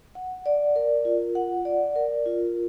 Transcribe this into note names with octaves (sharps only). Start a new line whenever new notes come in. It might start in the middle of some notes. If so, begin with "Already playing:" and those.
F#5
D5
A#4
F4
F#5
D5
A#4
F4